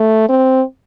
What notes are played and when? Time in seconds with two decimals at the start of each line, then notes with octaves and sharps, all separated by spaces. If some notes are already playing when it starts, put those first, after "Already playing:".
Already playing: A3
0.29 C4